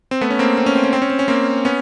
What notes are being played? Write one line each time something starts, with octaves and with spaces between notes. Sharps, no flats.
C4
A3 B3
C#4
A#3 C4
C4
C#4
C4
C#4
C4
C#4
C4
C#4
A#3 C4
B3 C#4